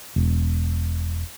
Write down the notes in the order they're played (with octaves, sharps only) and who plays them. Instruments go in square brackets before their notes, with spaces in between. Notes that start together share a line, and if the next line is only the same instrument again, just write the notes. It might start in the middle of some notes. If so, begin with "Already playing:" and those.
[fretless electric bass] E1